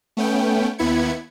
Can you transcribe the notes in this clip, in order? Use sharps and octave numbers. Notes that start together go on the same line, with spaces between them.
A3 B3 C#4 G5
D#2 B3 E4 B5 G#6 C#7